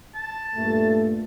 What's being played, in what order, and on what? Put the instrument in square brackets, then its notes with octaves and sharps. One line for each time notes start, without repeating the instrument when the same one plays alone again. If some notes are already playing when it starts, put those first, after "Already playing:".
[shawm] A5
[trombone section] G2 A#2 A3